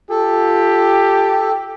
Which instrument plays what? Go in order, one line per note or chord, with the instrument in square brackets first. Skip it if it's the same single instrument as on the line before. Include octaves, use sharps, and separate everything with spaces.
[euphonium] F4 [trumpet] G4 [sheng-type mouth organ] A4